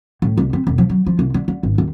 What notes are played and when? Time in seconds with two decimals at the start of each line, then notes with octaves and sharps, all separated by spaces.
0.22 A2
0.37 C2
0.53 C4
0.67 E1
0.78 F3
0.90 F#3
1.06 F3
1.19 C2
1.34 D3
1.48 D3
1.63 G#1
1.78 D#2